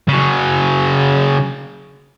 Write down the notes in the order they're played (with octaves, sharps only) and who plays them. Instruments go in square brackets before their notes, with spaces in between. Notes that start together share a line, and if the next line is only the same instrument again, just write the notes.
[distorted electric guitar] C#3 F#3